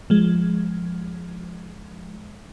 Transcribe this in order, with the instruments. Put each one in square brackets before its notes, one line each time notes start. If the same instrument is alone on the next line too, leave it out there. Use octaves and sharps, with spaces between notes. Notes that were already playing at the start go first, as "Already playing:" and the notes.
[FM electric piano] F3 G#3